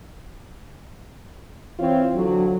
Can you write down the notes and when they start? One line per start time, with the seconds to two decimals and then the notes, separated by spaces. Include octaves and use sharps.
1.79 E3 C4 F4 C#5
2.15 D3 F#3